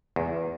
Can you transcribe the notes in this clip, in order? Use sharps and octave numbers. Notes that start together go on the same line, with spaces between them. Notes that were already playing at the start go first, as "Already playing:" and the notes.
E2